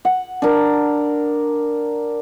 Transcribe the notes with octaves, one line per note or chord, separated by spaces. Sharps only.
F#5
D4 A#4